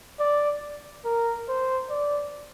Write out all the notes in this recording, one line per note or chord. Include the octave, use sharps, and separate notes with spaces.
D5
A#4
C5
D5